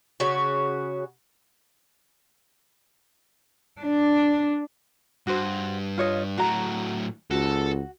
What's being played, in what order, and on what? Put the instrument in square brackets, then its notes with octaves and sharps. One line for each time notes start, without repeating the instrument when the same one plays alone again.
[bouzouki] C#3 F#4
[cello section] D4
[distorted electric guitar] G2 [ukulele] F#4 C5
[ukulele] F4 C#5 D#5
[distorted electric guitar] A2 F#3 [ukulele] F#4 A#5
[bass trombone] C#2 [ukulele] F#4 [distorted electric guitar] A4